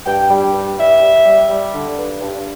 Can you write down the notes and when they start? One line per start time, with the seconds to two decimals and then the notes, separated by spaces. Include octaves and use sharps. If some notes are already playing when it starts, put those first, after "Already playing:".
0.06 G2 G5
0.30 G3
0.54 G2
0.77 G3 E5
1.01 G3
1.25 G3
1.49 G3
1.73 D3
1.97 G2
2.20 G2